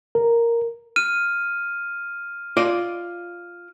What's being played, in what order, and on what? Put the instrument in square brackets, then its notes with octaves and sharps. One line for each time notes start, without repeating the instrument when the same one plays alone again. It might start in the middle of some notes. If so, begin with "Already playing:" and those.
[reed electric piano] A#4
[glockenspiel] F6 D#7
[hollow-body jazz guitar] F4 D5 D#5